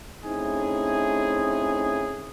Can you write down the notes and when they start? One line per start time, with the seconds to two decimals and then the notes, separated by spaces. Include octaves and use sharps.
0.24 A3 C4 C#4 D#4 E4 G#4